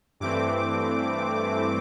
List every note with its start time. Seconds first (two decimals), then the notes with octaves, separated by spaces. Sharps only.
0.20 G2 E3 A3 C4 D6